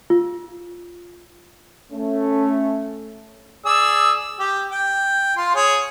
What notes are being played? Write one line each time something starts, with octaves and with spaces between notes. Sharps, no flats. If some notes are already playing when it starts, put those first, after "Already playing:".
F4
A3 C#4
G#4 D5 E6
G4
G5
F4 C6
G#4 C#5